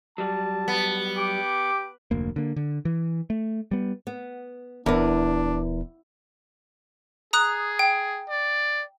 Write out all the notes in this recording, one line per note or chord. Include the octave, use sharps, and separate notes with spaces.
F#3 G3 A5
B3
G4 D6
F1 D2 A#3
D3 A#3
D3
E3
A3
G3 B3
B3
D#1 E2 D4 E4 A#4 B4
G#4 A#5 D#6 F#6
G5
D5